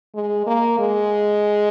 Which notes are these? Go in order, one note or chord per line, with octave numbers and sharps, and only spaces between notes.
G#3
A#3
G#3